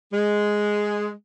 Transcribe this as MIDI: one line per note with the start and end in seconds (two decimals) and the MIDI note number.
0.12 1.10 56